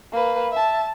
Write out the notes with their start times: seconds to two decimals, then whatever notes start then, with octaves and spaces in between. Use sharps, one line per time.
0.12 A#3 B4
0.52 E5 A5